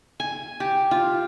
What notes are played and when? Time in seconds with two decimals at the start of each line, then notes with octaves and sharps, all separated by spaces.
0.20 G#5
0.60 G4
0.91 F4